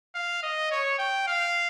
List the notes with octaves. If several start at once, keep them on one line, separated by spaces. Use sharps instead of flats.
F5
D#5
C#5
G5
F5